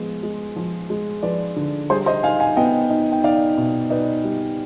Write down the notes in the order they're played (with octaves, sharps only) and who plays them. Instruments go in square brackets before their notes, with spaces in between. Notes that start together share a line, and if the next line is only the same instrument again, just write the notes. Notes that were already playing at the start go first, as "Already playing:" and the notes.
Already playing: [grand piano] F3 G#3 B3
G#3
F3
G#3
F3 B4 D5
D3
G3 G#4 C5
C5 D#5
D#4 F5 G#5
F5 G#5
B3 D#5 G5
D#4
G5
D#4 D5 F5
B2
D#4 B4 D5
G3